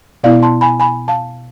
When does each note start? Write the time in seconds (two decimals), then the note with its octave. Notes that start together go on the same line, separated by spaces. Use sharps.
0.24 B2 B3 E4 D5 F5
0.42 A5 C6
0.61 G#5 B5
0.80 G#5 B5
1.08 F5 A5